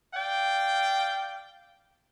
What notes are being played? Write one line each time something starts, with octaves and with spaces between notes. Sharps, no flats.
D5 F5 G5